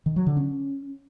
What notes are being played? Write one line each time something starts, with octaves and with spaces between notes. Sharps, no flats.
D#3
F#3
D3
C#4